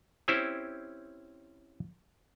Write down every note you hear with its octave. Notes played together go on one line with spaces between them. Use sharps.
C4 C#4 E4 G4 C5